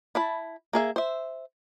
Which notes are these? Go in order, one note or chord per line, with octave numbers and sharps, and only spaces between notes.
E4 A5 B5
A#3 G#4 E5
C5 E5